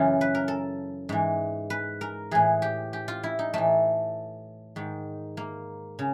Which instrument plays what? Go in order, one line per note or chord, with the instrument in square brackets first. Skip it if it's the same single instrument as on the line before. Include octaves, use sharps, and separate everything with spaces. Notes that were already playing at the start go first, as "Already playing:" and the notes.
Already playing: [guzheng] F#2 C#3 E3 F4
B4
A#4
A4
G#2 E3
B4
A#4
A2 E3 G#4
G4
G4
F4
E4
D#4
A2 E3 A3
G#2 D#3
A#3
C#3